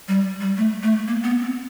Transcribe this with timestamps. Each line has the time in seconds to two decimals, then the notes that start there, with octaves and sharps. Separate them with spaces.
0.08 G3
0.40 G3
0.57 A3
0.83 A3
1.08 A#3
1.24 B3
1.40 C4